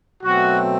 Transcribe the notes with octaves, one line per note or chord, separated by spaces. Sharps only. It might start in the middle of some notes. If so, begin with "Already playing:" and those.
B2 F#3 A3 C4 F#4